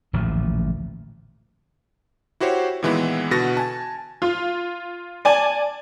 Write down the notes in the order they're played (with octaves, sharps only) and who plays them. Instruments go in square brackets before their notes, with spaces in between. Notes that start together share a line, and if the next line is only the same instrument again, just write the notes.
[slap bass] D1 A1 A#2 F3
[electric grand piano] E4 F#4 G4 C5 C#5
A#2 D#3 E3 G#3 B3 E4
B2 D3 F#4 B4 A6 A#6
G#5 A5
[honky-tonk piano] F4
D5 G#5 A5